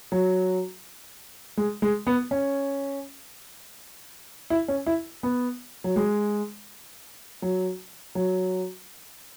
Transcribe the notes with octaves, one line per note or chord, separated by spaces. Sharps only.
F#3
G#3
G#3
B3
C#4
E4
C#4
E4
B3
F#3
G#3
F#3
F#3